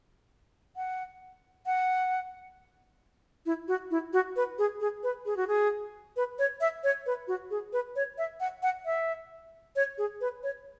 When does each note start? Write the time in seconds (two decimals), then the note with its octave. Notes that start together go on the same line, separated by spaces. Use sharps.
0.76 F#5
1.66 F#5
3.46 E4
3.68 F#4
3.91 E4
4.13 F#4
4.36 B4
4.58 G#4
4.81 G#4
5.03 B4
5.26 G#4
5.37 F#4
5.48 G#4
6.16 B4
6.39 C#5
6.61 E5
6.84 C#5
7.06 B4
7.28 F#4
7.51 G#4
7.73 B4
7.96 C#5
8.18 E5
8.40 F#5
8.63 F#5
8.85 E5
9.76 C#5
9.98 G#4
10.21 B4
10.43 C#5